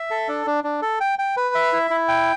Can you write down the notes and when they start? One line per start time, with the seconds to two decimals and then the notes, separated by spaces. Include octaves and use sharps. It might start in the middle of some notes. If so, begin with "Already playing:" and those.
Already playing: E5
0.11 A4
0.28 D4
0.47 D4
0.64 D4
0.82 A4
1.01 G5
1.19 G5
1.37 B4
1.55 E5
1.73 E4
1.91 E4
2.08 G5